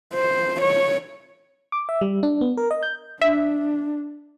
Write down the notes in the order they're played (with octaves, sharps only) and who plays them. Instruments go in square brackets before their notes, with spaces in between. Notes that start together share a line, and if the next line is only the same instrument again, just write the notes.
[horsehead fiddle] C5
C#5
[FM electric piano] D6
E5
G3
D4
B3
A#4
D#5
G6
[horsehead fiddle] D4 [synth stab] E5